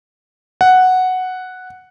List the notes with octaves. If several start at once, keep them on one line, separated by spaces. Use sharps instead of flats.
F#5